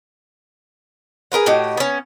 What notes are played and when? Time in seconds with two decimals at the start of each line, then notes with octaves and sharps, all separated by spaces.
1.32 G#4 A#4 B4 F#5
1.46 A2 F#4 G4 D#5
1.77 B3 C#4